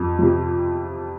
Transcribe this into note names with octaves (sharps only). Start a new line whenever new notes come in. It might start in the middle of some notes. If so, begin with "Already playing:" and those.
Already playing: F2
C3 F3